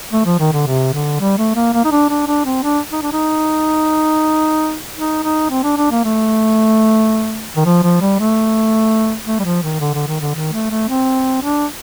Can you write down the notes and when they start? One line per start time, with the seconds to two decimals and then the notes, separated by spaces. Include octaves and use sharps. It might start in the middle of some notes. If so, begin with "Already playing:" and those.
0.12 A3
0.26 F3
0.39 D#3
0.53 D3
0.66 C3
0.93 D3
1.20 G3
1.38 A3
1.56 A#3
1.74 A#3
1.85 D#4
1.92 D4
2.09 D4
2.27 D4
2.45 C4
2.63 D4
2.92 D#4
3.02 D4
3.12 D#4
4.96 D#4
5.23 D#4
5.50 C4
5.63 D4
5.77 D4
5.91 A#3
6.04 A3
7.56 D#3
7.65 F3
7.83 F3
8.01 G3
8.19 A3
9.26 A3
9.40 G3
9.44 F3
9.63 D#3
9.80 D3
9.94 D3
10.07 D#3
10.21 D3
10.34 D#3
10.52 A3
10.70 A3
10.88 C4
11.42 D4